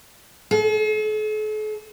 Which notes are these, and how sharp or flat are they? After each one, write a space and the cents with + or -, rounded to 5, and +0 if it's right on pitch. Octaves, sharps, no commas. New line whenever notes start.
A4 -45